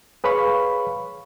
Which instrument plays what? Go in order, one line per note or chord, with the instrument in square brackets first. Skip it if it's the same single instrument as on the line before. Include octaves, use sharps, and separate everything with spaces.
[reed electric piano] G#4 B4 C#5 F5 B5 C#6